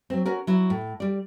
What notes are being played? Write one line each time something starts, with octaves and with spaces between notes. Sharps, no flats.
F#3 C4
C#4 F#4 A#4
F#3 E4
A2
G3 D5